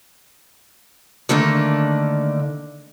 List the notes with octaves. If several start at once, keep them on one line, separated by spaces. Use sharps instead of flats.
D3 D#3 A3 A#3 D4